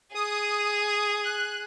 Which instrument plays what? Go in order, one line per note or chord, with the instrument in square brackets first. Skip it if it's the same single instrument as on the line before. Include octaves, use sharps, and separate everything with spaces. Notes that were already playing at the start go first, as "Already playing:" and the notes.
[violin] G#4 [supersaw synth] D#6
[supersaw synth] D#6
F#6